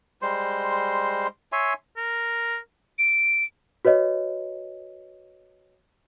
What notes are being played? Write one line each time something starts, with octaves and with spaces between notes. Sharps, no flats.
G3 G#3 C5 C6
C#5 E5 G#5 C6
A#4
D7
F#4 B4 C#5 D#5